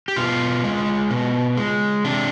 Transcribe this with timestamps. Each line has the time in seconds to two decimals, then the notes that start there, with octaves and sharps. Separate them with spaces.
0.08 G4
0.16 B2 F4
0.64 G#3
1.11 B2
1.57 G#3
2.05 C3 D4